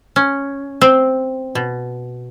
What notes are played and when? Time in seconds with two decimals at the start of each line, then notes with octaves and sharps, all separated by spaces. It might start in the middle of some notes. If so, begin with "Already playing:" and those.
0.16 C#4
0.81 C4
1.55 B2